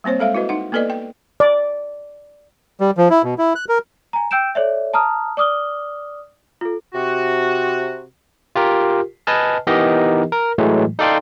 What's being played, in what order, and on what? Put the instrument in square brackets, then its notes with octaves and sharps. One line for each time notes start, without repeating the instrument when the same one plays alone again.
[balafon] G3 A#3 C4 C5 C#5
G#3 A4 E5 F5
E4 F#4 B4 D#5
D#4 F#5
A#3 B3 A4 B4 D5 D#5
G5
[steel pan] D5
[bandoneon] G3
F3
E4
B2
E4
F#6
A#4
[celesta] G#5 A#5
G5 E6 G6 D7 E7
A4 C#5 D5 E5
A5 A#5 D#6 F6
D5 D6 D#6 F6 G7
F4 A4
[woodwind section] C3 F#4
[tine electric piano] F4 G4 A#4
B4 D#5 G#5 A5 F6
E3 B3 D#4 G4 A#4 D#5
A#4
A2 E3 F#3 G#3 A3
D#4 A4 D5 F5 G5 C6